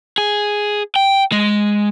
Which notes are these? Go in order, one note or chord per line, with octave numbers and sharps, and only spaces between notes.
G#4
G5
G#3